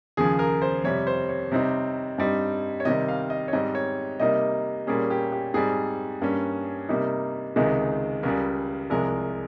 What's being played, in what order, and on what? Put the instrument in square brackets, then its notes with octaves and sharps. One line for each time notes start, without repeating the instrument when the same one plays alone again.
[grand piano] D#2 C#3 F3 G#4
A#4
C5
F2 C3 G3 C#5
C5
C#5
C3 G3 C4 D#4
G2 G3 C4 D#4
C#5
C3 D#3 G3 C4 D#5
F5
D#5
C#5
G#2 G3 C4 D#5
C#5
C3 G3 A#3 D#4 D#5
A#2 G3 A#3 C#4 G#4
G4
G4
G#2 G3 C4 G#4
G2 G3 A#3 C#4
C3 G3 A#3 D#4
C#2 C3 D#3 G#3 D#4
C#2 C#3 G3 A#4
C2 C3 F3 G#3 A#4